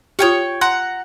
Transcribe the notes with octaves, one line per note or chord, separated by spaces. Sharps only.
F4 G4 C#5 G5 C#6
F#5 A#5 C6